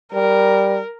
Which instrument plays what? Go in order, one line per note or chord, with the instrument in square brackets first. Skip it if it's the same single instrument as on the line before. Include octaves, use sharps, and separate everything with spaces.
[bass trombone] G3 [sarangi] A#4